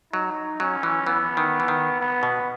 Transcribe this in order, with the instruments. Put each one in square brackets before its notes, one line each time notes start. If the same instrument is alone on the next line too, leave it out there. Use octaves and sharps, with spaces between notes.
[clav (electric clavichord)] F#3 [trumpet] D#4
[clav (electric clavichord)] F#3 [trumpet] C#4
[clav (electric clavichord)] E3
[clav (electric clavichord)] E3 [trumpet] B3
[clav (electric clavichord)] D#3
E3
D#3
[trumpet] B3
[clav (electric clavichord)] B2